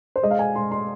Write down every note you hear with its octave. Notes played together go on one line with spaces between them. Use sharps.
C5
G#3 D#5
F5
G#5
G#3 C6
C6